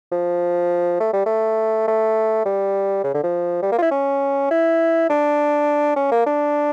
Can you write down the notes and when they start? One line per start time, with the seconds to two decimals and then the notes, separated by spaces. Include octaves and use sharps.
0.12 F3
1.00 A3
1.13 G3
1.26 A3
1.88 A3
2.45 G3
3.04 C#3
3.14 D3
3.23 F3
3.62 G3
3.72 A#3
3.78 F4
3.82 E4
3.91 C#4
4.51 E4
5.10 D4
5.96 C#4
6.12 A#3
6.26 D4